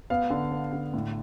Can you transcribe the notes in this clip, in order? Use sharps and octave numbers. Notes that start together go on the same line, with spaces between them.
B3 F5
D3
B3
D3
A2